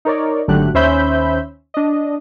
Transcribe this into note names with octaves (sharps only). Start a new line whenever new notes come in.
D#4 A#4 C#5 D5
G#1 D3 F#3 A3 G4 F#6
D#2 C#4 C5 E5 B5 G6
D4 D#5